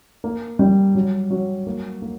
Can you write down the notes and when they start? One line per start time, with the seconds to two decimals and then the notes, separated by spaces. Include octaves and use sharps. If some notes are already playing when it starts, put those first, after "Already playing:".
0.24 A#3
0.59 G3
0.95 F#3
1.31 F#3
1.67 A#3
2.02 A#3